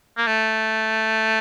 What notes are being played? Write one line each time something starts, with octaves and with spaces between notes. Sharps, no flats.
A#3
A3